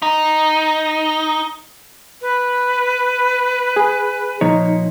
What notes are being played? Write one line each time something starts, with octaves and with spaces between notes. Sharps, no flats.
D#4
B4
G#4
A#2 F3 D#4 C#5